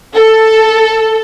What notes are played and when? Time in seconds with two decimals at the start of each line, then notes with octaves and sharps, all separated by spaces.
0.14 A4